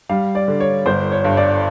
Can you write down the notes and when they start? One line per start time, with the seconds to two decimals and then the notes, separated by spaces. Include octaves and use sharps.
0.09 G3 F5
0.35 D5
0.48 D3
0.60 C#5
0.86 G1 C5
1.12 C#5
1.25 G2
1.37 D5